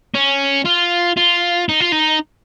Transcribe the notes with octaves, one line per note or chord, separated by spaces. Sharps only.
C#4
F4
F4
D#4
F4
D#4